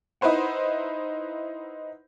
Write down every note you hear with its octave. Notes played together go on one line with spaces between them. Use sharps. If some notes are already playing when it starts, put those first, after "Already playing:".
D#4 E4 B4 C5 F#5